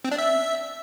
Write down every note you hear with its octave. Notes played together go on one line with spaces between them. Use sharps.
C4
D4
E5